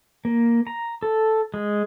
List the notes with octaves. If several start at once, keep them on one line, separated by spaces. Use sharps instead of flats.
A#3
A#5
A4
G#3